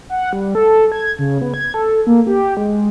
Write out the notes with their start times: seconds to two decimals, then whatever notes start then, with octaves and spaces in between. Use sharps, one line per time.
0.10 F#5
0.33 G3
0.55 A4
0.92 G#6
1.19 C#3
1.42 B3
1.54 G#6
1.74 A4
2.07 A#3
2.27 G4
2.57 G#3